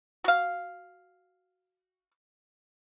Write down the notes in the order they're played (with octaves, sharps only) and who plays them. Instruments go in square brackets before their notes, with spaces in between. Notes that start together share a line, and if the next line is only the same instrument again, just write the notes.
[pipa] F#4 F5